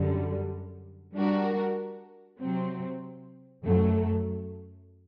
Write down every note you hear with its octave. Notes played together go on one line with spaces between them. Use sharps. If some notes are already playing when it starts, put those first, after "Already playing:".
Already playing: F#2 D3 G3
G3 D4 F#4 A#4
C3 F#3 C4
F#2 F#3 A3